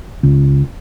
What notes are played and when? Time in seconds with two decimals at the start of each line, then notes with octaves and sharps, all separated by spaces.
0.23 C#2